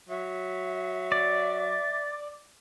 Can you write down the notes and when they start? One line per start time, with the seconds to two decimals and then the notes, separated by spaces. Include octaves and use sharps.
0.09 F#3 E5
1.12 D5